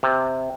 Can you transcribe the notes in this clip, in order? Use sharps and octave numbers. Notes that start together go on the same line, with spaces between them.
C3